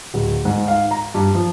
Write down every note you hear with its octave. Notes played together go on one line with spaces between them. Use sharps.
D1
G#2
F5
A#5
G2
F3